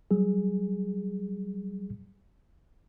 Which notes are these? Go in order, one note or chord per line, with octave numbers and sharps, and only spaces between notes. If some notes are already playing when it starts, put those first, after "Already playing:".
F#3 G3 G#4